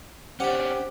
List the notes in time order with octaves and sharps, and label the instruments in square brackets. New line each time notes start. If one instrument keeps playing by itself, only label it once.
[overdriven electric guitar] C#4 D4 [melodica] G4 [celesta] C5 [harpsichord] F#5 G5